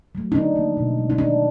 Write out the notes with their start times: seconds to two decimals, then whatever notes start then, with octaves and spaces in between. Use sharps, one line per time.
0.15 F#3 A3
0.32 D#4
0.35 D3 D4
0.56 F3 A#3
0.77 B2
0.98 G#3
1.10 D#4
1.18 D#3 D4